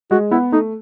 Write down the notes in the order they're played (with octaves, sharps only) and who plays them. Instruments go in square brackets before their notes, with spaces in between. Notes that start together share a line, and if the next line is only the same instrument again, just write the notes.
[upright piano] G#3 [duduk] F#4
[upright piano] B3 [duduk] E4
[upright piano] A3 [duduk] D#4